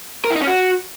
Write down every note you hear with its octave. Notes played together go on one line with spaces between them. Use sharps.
A#4
E4
D#4
C#4
F#4